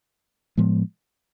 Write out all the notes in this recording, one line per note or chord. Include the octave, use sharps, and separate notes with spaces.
A2 F3 G#3 B3